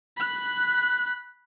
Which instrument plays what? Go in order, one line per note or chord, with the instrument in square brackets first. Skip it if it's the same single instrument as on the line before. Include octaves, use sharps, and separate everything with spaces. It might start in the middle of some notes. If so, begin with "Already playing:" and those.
[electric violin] B5 F#6